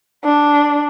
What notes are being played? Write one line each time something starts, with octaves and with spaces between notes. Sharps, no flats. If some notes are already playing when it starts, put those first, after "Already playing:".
D4